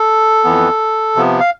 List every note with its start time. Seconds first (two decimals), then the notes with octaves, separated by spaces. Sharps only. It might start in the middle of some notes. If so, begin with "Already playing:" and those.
Already playing: A4
0.44 F2 E3 B3
1.16 C3 F3 B3
1.40 F5